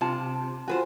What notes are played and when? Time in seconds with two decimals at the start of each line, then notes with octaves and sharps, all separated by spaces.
0.01 C3 F4 A5
0.68 F4 F#4 B4 C5 G#5